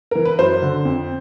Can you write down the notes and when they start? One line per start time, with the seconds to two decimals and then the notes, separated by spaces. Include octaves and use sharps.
0.11 E3 A#4
0.25 B4
0.39 F#2 C5
0.62 D3
0.85 F2